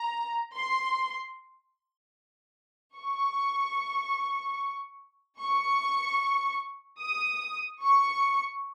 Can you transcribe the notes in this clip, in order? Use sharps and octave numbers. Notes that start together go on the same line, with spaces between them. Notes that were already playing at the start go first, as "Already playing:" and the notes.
Already playing: A#5
C6
C#6
C#6
D#6
C#6